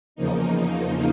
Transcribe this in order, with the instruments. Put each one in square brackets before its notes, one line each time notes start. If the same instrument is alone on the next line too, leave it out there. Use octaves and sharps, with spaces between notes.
[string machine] E2 C#3 F3 A#3 D#4